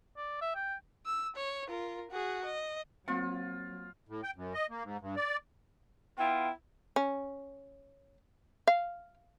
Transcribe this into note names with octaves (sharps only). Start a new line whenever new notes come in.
D5
E5
G5
E6
C#5
F4 A#4
F#4 G#4
D#5
F#3 A#3 C4 F4 F#5
A2
G5
F#2
D#5
A#3
G#2
G2
D5
B3 E4 F4 G5
C#4
F5